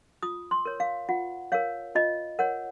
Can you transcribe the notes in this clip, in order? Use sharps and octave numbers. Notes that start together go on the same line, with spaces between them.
F4 D#6
C6
A#4 C#5
F5
F4 F#5
A#4 C#5 F5
F4 D#5
A#4 C#5 F#5